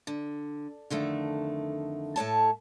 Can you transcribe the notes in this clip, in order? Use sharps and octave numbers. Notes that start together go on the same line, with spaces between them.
D3
F2 D3 D#3 A3
A2 A4 C#5 A5